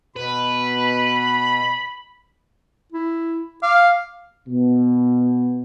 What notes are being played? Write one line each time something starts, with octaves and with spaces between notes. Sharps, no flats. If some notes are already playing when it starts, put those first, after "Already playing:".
B2 B4 B5
E4
F5 D6
B2